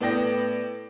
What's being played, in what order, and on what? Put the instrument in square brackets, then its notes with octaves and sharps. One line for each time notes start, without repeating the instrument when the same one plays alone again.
[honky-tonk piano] A2 B3 D5 G5 A#6